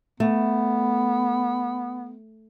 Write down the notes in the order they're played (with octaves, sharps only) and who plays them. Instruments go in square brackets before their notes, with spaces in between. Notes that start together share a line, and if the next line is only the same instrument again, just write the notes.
[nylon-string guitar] A3 [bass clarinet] B3